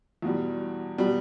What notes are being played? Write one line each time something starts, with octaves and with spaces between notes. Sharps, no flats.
E2 B2 G3
B2 G3